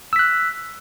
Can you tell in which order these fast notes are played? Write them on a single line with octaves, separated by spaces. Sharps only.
E6 B6 F#6